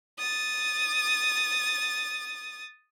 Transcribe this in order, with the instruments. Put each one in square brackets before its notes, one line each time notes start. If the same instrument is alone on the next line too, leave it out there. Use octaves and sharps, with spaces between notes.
[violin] D#6 A6